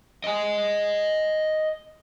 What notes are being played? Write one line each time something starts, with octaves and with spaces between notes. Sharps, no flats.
D#5 G#5